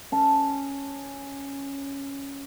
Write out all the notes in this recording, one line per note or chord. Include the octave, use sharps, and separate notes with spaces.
C#4 A5